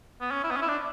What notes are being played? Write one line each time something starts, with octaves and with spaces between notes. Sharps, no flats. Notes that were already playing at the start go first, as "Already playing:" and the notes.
B3
C#4
E4
B3
C#4
E4
D4